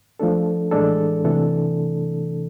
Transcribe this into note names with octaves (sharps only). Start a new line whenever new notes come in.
F3 A3 D4 A4
A2 E3 G#3 D4 A4
C3 E3 A3 D4 A4